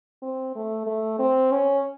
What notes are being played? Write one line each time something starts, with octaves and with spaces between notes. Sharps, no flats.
C4
A3
A3
C4
C#4